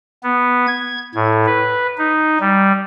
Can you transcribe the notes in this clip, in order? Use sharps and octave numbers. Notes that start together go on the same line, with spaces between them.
B3
G#6
A2
B4
D#4
G3